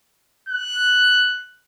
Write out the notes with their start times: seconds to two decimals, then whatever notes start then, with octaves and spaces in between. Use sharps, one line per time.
0.49 F#6